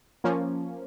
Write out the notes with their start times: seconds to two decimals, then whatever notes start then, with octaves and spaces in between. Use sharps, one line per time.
0.24 F3 A#3 C#4